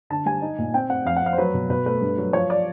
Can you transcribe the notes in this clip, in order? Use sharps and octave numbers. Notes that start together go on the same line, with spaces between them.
D3 A5
G3 G#5
D#4
A#2
C4 G5
C4 F#5
F2 F5
F#5
F2 F5
C5
F#3 B4
B2
B2 B4
A3 B4
G2
F#3
F3 C#5
D5